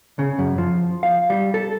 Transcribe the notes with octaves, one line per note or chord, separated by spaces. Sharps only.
C#3
F#2
F3
F5
G3
A4